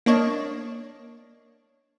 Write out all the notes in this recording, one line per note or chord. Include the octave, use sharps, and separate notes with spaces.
A#3 D4 C#5 D#5